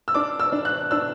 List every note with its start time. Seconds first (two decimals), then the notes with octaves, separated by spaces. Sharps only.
0.08 E6
0.14 D4 D6
0.40 E6
0.52 D4
0.65 F#6
0.91 D4 E6